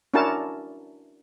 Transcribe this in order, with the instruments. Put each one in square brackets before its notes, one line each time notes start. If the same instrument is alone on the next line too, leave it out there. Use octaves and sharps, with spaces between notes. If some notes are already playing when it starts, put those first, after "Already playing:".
[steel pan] C#4 D4 E4 F#4 A#4 A5